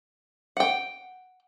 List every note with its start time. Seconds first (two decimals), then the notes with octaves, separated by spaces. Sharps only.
0.57 F#5 G5